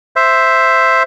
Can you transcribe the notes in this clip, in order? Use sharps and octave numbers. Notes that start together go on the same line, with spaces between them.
C5 E5